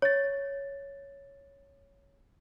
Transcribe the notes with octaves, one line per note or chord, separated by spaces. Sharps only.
C#5 A6